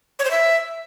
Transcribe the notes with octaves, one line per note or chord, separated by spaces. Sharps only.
C#5
C5
E5